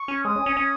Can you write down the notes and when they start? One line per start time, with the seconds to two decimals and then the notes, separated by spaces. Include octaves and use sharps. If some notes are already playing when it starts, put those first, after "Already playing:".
Already playing: C#6
0.08 C#4
0.24 G#3 D#6
0.36 C#4
0.46 C#4
0.57 C#4